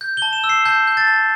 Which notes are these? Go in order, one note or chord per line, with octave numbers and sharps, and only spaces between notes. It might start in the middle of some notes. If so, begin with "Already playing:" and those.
G6
A5 G7
E7
E6
C7
A5 G6
G6
A6
A5